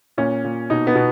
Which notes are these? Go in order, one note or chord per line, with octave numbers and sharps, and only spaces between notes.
A#2 C#4
A#2
B2 D#4
B3
B2